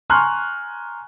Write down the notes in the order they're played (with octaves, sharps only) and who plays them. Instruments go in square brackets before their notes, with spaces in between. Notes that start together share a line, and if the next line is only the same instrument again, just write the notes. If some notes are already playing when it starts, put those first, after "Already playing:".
[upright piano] G#5 A#5 C6 C#6 F6 F#6